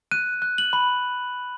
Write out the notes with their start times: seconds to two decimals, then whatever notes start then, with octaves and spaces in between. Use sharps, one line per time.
0.11 F#6 D#7
0.42 F#6
0.58 F#7
0.73 B5